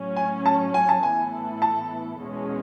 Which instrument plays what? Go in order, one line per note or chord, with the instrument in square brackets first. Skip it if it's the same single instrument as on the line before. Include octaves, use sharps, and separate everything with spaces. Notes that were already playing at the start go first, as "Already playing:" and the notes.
Already playing: [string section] A2 F#3 C#4
[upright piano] G#5
A5
G#5
A5
[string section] A2 E3 B3 E4 A4 [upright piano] G#5
[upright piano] A5
[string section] E2 B2 G#3 C#4